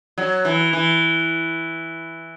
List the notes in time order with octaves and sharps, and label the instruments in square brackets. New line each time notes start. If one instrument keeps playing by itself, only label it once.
[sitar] F#3
E3
E3